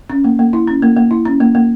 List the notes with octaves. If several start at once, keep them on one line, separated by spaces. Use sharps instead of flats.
C#4
A#3
A#3
E4
C#4
A#3
A#3
E4
C#4
A#3
A#3